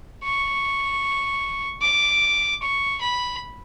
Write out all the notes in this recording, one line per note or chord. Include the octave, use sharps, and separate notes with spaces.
C#6
D6
C#6
B5